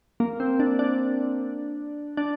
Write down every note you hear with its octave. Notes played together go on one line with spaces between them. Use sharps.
A#3
C4
D4
D4
D4